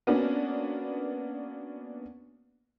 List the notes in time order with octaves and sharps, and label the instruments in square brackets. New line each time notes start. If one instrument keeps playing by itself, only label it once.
[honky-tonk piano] A#3 B3 C#4 D4 F#4